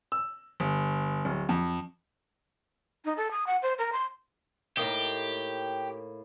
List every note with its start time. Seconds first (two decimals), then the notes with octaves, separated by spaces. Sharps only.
0.12 E6
0.60 G1
1.25 D1
1.49 F2
3.05 D#4
3.17 A4
3.31 D#6
3.47 F#5
3.62 C5
3.79 A#4
3.93 C6
4.77 A2 A#3 D#4 G4